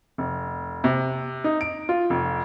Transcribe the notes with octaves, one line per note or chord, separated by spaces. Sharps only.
F1
C3
D#4
D7
F4
F1